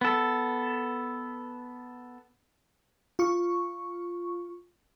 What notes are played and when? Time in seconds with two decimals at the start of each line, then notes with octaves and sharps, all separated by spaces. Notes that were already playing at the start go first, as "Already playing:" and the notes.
0.01 B3 A4
3.19 F4 C#6